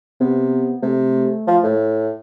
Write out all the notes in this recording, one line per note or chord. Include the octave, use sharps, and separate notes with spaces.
C3 B3
C3 A3
F3
A2